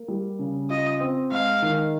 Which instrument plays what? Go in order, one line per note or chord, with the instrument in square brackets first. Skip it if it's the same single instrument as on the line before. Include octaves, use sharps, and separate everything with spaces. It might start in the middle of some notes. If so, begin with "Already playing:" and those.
Already playing: [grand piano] A#3
G3
C#3
[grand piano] F4 [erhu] D#5
[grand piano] C4
[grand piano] G#3 [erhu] F5
[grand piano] D#3